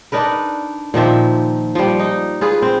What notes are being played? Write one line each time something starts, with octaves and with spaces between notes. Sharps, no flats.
D4 D#4 A#4 B4
A#2 D#3 F3 E5
F3 G3
D#4
F4 G#4 B4
C4